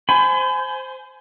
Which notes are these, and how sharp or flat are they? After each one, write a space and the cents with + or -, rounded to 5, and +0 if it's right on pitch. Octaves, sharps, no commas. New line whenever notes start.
C5 +0 G#5 +20 B5 +40